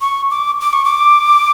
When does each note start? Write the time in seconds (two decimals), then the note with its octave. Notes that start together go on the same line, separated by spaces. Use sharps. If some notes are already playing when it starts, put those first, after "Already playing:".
0.01 C#6
0.31 D6
0.61 D6
0.73 C#6
0.85 D6